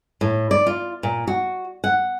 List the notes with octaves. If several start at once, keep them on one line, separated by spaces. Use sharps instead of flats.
A2
D5
F4
A#2
F#4
F#5